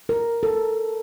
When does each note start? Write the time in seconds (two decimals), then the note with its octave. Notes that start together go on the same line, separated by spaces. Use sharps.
0.09 A#4
0.43 A4